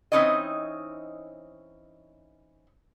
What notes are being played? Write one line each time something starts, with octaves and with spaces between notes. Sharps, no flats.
E3 C4 C#4 D#4 C#5 D#5